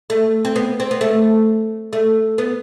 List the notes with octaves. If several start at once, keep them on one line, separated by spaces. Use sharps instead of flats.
A3
C4
B3
C4
B3
A3
A3
B3